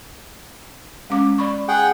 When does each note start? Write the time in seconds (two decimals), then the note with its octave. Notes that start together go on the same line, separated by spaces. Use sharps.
1.10 G#3 C#4 D6
1.38 D5 B5 C#6
1.68 G#4 F#5 G5